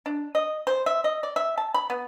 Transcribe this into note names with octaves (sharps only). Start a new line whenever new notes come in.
D4
D#5
C5
E5
D#5
D5
E5
A5
B5
B3